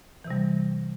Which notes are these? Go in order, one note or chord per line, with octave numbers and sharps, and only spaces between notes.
C3 E3 G3